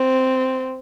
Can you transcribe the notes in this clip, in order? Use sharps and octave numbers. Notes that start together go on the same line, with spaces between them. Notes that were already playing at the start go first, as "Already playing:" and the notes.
Already playing: C4